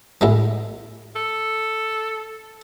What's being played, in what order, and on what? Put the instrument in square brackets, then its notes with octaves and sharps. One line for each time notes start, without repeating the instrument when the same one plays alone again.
[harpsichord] A2 G#3 B3
[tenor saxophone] A4